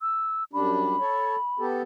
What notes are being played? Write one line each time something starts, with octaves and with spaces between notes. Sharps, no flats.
E6
F#2 G3 D4 B5
A4 C#5
B3 G4 A4